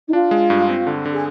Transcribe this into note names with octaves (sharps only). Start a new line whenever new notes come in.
D#4
D4 F4
G#3
G2
C4
D3
D3
G#4